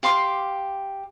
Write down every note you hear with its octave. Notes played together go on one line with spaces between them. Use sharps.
G4 F5 C6 D6